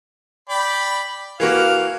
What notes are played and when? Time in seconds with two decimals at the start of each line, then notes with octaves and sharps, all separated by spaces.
0.49 D5 G5 B5
1.40 E3 A#3 F#4 F5